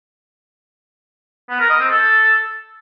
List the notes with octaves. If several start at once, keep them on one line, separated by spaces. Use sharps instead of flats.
B3
A#4
D#5
C4
A4